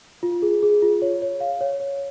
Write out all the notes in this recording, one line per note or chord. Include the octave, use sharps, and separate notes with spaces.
F4
G#4
G#4
F4
C#5
C#5
F5
C#5
C#5